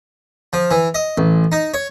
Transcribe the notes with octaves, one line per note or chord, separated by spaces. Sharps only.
F3
E3
D#5
A1
D#4
C#5